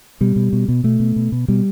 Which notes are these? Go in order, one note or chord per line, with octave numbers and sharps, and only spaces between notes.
B2 G3
B2
B2
B2
B2 A3
B2
B2
B2
B2 G3